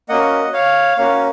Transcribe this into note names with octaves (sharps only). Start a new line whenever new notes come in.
A#3 C#4 F#4 D#5 F#5
C#5 F5
A#3 C#4 F#4 C#5 F5